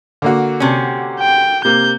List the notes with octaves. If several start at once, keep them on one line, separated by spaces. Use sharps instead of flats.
D3 A#3 F#4
C3 C#4
G5
C3 A#3 G6